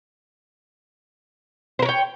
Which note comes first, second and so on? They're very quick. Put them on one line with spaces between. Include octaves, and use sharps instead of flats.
C5 A#4 C#5 G5